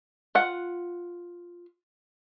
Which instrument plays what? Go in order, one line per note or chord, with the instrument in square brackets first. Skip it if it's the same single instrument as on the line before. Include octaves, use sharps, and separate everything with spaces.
[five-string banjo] F4 F#5